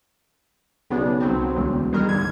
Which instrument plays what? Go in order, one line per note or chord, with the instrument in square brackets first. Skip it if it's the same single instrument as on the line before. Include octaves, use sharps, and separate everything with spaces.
[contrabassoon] B1 [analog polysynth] C#3 B3 D4
[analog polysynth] C2 F#3 C4
[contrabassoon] E1 [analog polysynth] D2
[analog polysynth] D#3 G#3 A#4 [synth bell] G3
[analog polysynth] C#2 G#2 D3 [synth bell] G#6